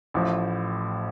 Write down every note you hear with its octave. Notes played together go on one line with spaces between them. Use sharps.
A1 A2 F3